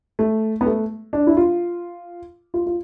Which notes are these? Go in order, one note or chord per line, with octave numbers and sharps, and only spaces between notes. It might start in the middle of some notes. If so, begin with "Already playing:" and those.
A3
B3
A3
D4
E4
F4
F4
F4